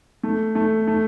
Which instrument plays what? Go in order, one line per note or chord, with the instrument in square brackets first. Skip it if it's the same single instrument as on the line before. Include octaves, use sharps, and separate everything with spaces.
[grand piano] A3
A3
A3